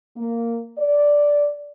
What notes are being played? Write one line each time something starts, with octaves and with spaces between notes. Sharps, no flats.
A#3
D5